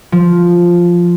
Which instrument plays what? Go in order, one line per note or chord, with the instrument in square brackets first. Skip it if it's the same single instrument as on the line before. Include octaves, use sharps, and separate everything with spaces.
[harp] F3